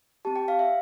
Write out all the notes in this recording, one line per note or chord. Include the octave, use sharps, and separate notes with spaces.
C4 G4 A5
G5
F5
E5